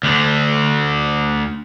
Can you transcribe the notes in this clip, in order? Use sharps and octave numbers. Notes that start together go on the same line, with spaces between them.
D2 D3